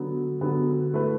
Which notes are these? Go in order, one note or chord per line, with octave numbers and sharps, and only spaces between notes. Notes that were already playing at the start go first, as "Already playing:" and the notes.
Already playing: D3 F#3 B3
D3 F#3 B3
A3 E4 B4